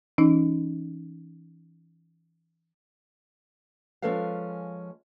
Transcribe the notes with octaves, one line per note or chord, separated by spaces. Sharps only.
E3 C#4 D#4
F3 G#3 C#4 A4 B4 F5